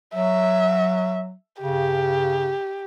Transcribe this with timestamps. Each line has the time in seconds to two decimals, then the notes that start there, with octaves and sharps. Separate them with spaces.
0.14 F#3 E5
1.62 G2 C#3 G4